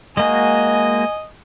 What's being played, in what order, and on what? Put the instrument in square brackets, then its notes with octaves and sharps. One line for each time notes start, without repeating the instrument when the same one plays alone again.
[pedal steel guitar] G#3 A#3 F#4 [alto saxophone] D#5 [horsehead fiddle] G#5